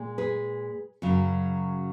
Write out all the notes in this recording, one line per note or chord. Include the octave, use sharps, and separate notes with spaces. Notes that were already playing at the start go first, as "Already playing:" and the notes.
Already playing: A#2 G#3
G#4 B4
F#2 C#3 F#3